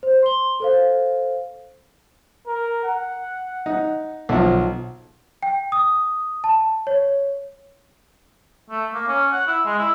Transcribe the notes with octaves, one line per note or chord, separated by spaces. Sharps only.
C5
C6 G7
A4 C5 F5
A#4
F#5
D#4
B1 F3
G5
D#6
A5
C#5
A3
A#3
C#4
F#5
E4
G#3
E4